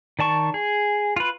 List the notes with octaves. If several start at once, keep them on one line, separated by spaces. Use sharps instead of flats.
D#3 D5 A5 C#6
G#4
F4 B4